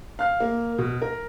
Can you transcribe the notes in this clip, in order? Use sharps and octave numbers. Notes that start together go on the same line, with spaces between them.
F5 F6
A#3
B2
A#4